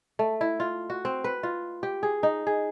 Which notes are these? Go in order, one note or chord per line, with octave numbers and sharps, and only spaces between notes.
A3
E4
F4
F#4
C4
B4
F4
G4
G#4
D#4
G#4